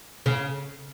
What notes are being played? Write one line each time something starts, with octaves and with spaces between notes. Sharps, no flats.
C#3